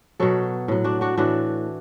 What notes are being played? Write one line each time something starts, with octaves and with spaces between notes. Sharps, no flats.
B2 F#3 A4 C#5
A2 F#3
D4 F#4
D4 F#4
A2 E3 D4 F#4